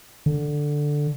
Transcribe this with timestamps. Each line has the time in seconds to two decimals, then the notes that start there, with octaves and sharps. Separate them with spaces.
0.26 D3